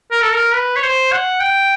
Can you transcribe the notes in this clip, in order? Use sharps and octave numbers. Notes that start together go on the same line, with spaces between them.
A#4
A4
A#4
B4
C#5
C5
F#5
G5